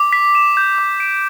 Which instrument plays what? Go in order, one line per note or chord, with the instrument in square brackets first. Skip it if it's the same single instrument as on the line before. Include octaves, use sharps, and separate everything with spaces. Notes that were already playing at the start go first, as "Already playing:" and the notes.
Already playing: [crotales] D6
B6
E7
G6
D6
D7